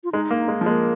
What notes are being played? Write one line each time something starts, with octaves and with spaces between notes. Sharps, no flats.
F4
G#3 D#4
A#3
G#3
F3
G#3 A#3